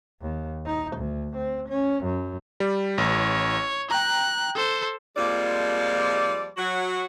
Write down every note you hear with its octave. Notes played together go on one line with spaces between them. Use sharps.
D#2
D#4
D2
C4
C#4
F#2
G3
A1 C#5
G5 A#5 F#6
A4 C5
F2 F3 G3 G#3 A#3 D5
F#3 F#4